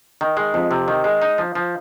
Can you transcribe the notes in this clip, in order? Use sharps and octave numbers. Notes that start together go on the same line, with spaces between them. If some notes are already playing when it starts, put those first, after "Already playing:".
D#3
G#3
F2
C3
D#3
G#3
D#4
F3
F3